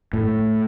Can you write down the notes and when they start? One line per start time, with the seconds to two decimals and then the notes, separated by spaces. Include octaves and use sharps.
0.13 A2